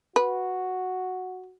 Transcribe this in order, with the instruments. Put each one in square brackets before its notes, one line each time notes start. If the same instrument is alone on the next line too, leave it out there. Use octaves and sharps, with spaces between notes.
[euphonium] F#4 [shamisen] B4